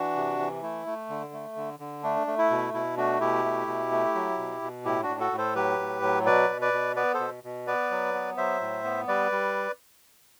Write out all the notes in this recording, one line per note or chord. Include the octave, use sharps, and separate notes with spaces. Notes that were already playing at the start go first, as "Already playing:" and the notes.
Already playing: E3 D4 F#4
C3
E3
A3 E4
A3
D3
A3
D3
D3
A3 D4
A3
E4
B2
B2 E4
A3 D4 F#4
B2 E4 G4
A3
B2
A3
F#3
B2
B2
A2 E4 G4
D4 F#4
A2
F#4 A4
A2
A4 C5
F#3 G4 B4
A2
F#3
B2 B4 D5
B2
B4 D5
B2
B3 B4 D5
A4 C5
B2
B2
B3 B4 D5
F#3
B3
F#3 C5 E5
A2
B3
G3 B4 D5
G3